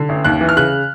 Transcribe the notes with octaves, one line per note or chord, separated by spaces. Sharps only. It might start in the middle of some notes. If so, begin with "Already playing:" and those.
Already playing: D3
A1
D#2 F#6
E3
F6
C#3 F#6